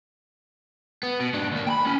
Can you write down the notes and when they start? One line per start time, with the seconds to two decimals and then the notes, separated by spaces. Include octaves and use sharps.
1.03 B3
1.20 B2
1.33 G#2 D4
1.52 D#2 A#3
1.67 G5 B5
1.85 A#3 C#4